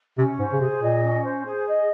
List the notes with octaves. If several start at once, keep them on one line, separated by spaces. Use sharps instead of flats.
C3 C#4
G#2 C5
C#3
C3 G#4
A#2 D#5
C#4
C5
G#4
D#5